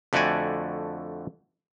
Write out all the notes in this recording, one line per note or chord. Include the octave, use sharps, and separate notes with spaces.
F2 D3 A3 F#4 D5 G#5